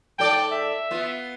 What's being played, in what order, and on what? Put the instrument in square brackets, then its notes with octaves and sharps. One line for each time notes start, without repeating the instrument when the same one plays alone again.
[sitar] G#2 A4 D5 [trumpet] G5
[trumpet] E5
[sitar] B3 F4